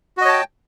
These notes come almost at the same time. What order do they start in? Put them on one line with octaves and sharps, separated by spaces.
F#4 D#5 C#5 A5 G5